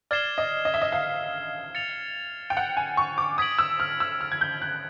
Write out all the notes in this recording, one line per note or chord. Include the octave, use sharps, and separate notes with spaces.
D5 F6 G#6 C7 E7 G7
D#5
D#5
E5
D#5
F5
A6 C#7 F7
G5
F#5
G#5
C#6
D6
D#6 G#6 B6 D7 F#7
E6
F6
E6
F6
G#6
G6
F#6